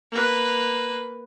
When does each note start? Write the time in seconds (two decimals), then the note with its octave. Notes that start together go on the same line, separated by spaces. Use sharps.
0.12 A#3 B4